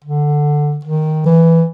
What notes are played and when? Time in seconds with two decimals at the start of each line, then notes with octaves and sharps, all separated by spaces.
0.04 D3
0.85 D#3
1.26 E3